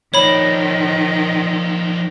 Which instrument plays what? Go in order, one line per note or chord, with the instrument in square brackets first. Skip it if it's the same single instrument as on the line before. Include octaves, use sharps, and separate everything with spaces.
[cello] D#3 [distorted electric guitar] F3 D4 [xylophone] C#5 B5